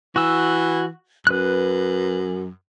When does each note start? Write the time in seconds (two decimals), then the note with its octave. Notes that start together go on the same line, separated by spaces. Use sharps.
0.16 E3 F#4 E6
1.27 F#2 B4 F#6